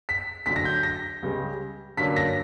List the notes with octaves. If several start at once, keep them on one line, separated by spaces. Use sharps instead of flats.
B6
D2 D3 F#3 B6
A#6
G6
A#6
C#2 C#3 G3
G2 D3 F#3 A#3 C#4 B6
A#6